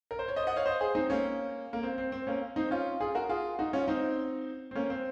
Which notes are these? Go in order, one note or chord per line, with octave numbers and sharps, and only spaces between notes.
A#4
C5
C#5
C5 D#5
D#5 F#5
C#5 F5
C5 D#5
G#4 C5
C4 D#4
A#3 C#4
A#3
C4
C4
C4
A#3 C#4
C4 D#4
C#4 F4
F4 G#4
F#4 A#4
F4 G#4
D#4 F#4
C#4 F4
C4 D#4
C4
A#3 C#4
C4